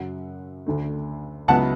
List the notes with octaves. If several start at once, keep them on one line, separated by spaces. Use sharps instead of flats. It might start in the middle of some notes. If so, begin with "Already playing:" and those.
Already playing: F#2 C#3 F#3 F#5
D2 D3 A3
C#2 C#3 F#3 B3 E4 F#5 A5